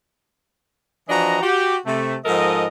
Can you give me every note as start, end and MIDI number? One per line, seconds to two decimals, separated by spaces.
1.09 1.38 52
1.09 1.38 53
1.09 1.38 62
1.09 1.38 66
1.09 1.38 75
1.09 1.38 82
1.42 1.76 66
1.42 1.76 67
1.86 2.15 48
1.86 2.15 57
2.25 2.66 44
2.25 2.66 53
2.25 2.66 69
2.25 2.66 70
2.25 2.66 75